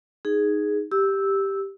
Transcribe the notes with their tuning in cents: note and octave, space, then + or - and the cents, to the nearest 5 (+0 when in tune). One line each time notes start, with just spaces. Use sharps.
D#4 +0 G#4 +0
G4 +0 E6 -10